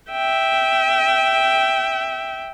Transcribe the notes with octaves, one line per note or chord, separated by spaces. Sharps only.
E5 G5